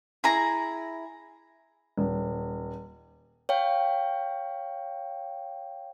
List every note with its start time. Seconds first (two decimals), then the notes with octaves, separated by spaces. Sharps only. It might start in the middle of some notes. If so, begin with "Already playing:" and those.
0.24 E4 G#4 A#5
1.98 D#1
3.49 C#5 F5 G5